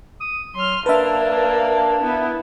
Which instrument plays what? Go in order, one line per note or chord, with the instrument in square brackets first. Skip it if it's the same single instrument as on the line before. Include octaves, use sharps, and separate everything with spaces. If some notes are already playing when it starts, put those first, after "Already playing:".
[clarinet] D#6
[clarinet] F#3 [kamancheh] C6 F6
[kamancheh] A#3 D4 [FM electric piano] B4 E5 [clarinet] A5
[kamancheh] B3 E4